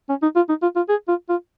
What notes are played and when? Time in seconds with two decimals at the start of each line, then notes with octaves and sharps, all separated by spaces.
0.09 C#4
0.22 D#4
0.36 F4
0.49 D#4
0.62 F4
0.76 F4
0.89 G#4
1.08 F4
1.29 F4